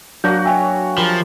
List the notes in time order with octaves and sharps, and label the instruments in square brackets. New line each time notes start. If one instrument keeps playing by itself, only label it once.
[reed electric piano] F#3 D4 [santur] A#3 F#4 [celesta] G6
[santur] C#5 E5 [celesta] G5 G#5
[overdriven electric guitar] F3 [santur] G4 A#4 B5